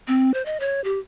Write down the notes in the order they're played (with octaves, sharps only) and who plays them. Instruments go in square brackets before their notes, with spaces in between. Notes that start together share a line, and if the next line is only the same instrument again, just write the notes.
[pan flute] C4
C5
D#5
C#5
G4